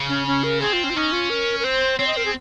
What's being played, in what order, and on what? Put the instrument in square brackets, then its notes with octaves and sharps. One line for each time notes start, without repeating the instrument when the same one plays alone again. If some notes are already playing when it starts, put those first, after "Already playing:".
Already playing: [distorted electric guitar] C#3
[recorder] C#4
C#4
A#4
[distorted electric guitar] C4 [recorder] G#4
[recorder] F4
C#4
F4
[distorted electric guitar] C#4 [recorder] D#4
[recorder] F4
A#4
A#4
[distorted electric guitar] C4 [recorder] C5
[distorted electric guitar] C4 [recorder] C#5
[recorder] D#5
A#4
G#4